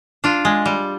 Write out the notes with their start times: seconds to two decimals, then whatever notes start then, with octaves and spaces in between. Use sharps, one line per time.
0.24 D4 F4
0.45 G#3
0.66 G3